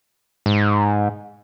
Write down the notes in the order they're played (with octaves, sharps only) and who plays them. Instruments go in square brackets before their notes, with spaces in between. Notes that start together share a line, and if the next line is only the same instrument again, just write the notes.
[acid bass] G#2